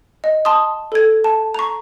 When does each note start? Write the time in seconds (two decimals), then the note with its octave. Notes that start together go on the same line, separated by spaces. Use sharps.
0.24 D#5
0.45 A5 C6 D#6
0.92 A4 G#6
1.24 A5
1.55 A#5 C#6